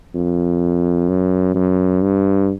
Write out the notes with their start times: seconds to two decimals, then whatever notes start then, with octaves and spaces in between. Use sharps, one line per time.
0.15 F2
1.09 F#2
1.55 F#2
2.02 G2